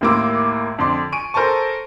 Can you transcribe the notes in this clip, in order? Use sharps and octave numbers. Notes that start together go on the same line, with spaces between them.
D#2 A2 A#3 C6 D6 E6
F2 D3 C6 D6
G#5 C#6 D7 D#7
A4 A#4 C5 G#5 A5 C#6